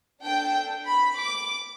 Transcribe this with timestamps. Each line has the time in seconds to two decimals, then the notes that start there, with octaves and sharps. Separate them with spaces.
0.24 D4 A4 G5
0.85 B5
1.18 D6